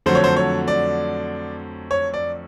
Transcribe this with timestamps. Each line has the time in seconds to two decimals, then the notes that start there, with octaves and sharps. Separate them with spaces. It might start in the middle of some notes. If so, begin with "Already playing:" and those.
0.06 F2 D3 F#3 A3 C5
0.15 C#5
0.24 C5
0.37 C#5
0.68 D5
1.91 C#5
2.14 D5